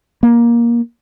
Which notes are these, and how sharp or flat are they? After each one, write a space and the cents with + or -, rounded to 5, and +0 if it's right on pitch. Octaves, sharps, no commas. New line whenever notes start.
A#3 +15